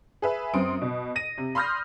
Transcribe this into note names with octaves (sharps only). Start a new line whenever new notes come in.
G#4 B4 E5
F#2 C4 C6 D#6 D7
B2
A#6 D#7
C3
B5 C6 D#6 F6 G6 A#6